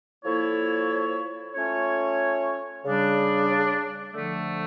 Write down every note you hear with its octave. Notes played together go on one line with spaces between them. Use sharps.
F3 A#3 E4 A4 C#5
A3 C#4 F4 C#5
C#3 G3 D4
D3 F3 A3